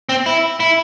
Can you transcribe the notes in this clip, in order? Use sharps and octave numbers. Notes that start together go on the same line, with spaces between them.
C4
E4
E4